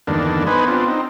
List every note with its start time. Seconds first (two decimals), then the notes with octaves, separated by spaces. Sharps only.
0.07 E2 G2 D3 D#3 A#3 D4
0.47 B3 D#4 B4 C5 G#5
0.68 B3 C4 D4 F4
0.88 C4 D#4